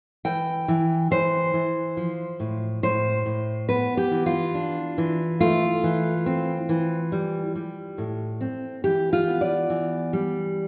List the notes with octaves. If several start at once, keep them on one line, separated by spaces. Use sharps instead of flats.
E3 G5
E3
E3 C5
E3
F3
A2
A2 C5
A2
B3 B4
G4
E3
F4
D4
E3
A3 F4
E3
C4
E3
G3
G3
A2
C4
E3 G4
F4
B3
D5
E3
G3